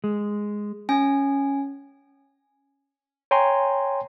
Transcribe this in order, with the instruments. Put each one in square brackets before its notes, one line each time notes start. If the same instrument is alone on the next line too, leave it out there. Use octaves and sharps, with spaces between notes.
[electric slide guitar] G#3
[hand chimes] C#4 G#5
[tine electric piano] C#5 G5 G#5 A#5 C6